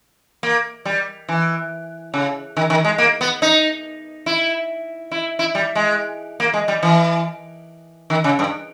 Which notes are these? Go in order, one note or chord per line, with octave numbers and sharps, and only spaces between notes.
A#3
G3
E3
C#3
D#3
D#3
G#3
A#3
B3
D#4
E4
E4
E4
G3
G#3
A#3
G#3
G3
E3
D#3
C#3
G2